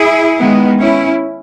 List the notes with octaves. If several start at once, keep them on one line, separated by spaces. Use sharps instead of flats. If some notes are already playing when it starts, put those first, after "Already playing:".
Already playing: E4 G#4
D#3 G#3 B3
C#4 E4